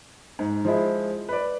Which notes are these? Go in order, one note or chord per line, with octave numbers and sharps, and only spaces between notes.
G#2
F3 G#3 E4
B4 D5